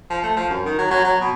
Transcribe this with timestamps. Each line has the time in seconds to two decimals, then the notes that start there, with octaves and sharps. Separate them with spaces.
0.10 F3
0.23 A3
0.37 F3
0.50 F#2
0.66 D#3
0.78 F#3
0.91 F#3
1.04 F#3
1.21 B2